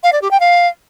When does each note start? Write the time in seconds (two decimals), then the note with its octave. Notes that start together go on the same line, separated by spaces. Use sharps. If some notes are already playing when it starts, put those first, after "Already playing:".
0.03 F5
0.12 D5
0.22 G4
0.31 G5
0.40 F5